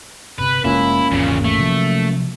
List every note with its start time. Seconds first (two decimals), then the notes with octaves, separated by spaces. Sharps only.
0.38 G1 C3 B4
0.64 F1 A2 G#3 A#3 C#4 E4 F4
1.11 G#1 E2 A#2 C#3
1.45 A3
1.58 C3 F3 F#3